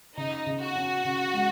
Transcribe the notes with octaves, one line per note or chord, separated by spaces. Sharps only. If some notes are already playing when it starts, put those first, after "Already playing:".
C#3 D#4
C#3
F#4
C#4
C#3
G#3